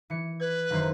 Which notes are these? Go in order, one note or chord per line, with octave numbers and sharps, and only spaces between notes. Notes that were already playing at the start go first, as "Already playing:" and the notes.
E3 C#7
B4 G#6
F#1 D#3 C5